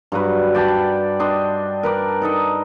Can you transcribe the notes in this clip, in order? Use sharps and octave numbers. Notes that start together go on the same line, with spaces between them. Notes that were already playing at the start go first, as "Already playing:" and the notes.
G2 F#3 B4
D5 G5 A5 B5
D4 D#5 C6
A#4 B4 D5
D#4 A4 D#5